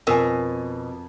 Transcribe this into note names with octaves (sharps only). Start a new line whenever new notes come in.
F2 B2 A#4 G#5